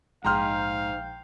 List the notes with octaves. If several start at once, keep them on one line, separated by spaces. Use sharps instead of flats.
A#1 G#2 F5 G5 A#5 C6 F6 G6